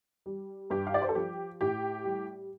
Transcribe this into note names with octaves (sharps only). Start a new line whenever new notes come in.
G3
G2 G4
F5
D5
C5
A4
F3 G4
A2 G4
G3